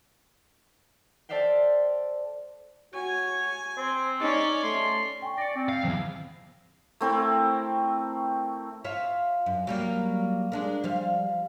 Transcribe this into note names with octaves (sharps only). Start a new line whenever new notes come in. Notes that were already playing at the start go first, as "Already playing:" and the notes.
A4 C5 D5 E5 F5 G5
F#4 C#5 G#5
C4 C5
C#4 D#4 D5
A3 C6
G5 G#5 C#6
D5 A#6 C#7
C4
F5
E2 F3
A3 C4 E4 A#4
F4 C#5 E5
F#2
F#3 G3 A#3
G#3 D4 A#4
F3 G3 F5